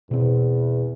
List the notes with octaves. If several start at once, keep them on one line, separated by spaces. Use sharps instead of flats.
E2 B2 C4